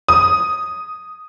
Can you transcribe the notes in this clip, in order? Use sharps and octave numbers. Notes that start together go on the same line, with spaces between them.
D#6